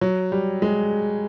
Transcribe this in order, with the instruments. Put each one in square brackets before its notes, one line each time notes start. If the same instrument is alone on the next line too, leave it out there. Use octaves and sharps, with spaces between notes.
[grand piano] F#3
G3
G#3